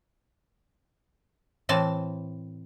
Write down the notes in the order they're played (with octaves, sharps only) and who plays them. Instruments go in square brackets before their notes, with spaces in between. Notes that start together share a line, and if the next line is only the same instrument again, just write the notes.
[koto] A2 E3 C4 A5